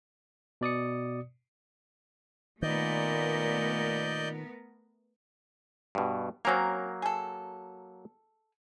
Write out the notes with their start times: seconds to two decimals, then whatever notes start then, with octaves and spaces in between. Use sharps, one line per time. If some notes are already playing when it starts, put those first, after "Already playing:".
0.61 B2 D5 D#6 C#7
2.62 A#2 D#3 A3 B3 A#4 D5 D#5 G6
5.95 G2 B2
6.45 F#3 A#3 C4 C#4 A#4
7.02 G#4 A4